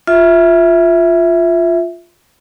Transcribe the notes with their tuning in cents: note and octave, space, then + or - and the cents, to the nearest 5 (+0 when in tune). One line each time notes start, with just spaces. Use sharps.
F4 +0 E5 +0